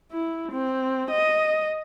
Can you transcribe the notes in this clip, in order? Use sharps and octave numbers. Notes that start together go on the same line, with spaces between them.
E4
C4
D#5